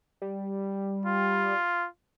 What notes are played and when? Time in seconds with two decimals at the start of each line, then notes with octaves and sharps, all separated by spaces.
0.22 G3
1.06 F4